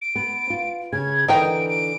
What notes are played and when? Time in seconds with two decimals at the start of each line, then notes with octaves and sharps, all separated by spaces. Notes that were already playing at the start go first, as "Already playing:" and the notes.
0.02 D7
0.16 B3
0.50 F4
0.93 C#3 G#6
1.28 D3 E3 D#4 A#4 G5 D7
1.69 D7